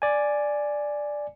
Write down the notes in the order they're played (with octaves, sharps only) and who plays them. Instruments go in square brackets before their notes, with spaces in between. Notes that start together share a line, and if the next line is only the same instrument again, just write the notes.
[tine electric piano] D5 G#5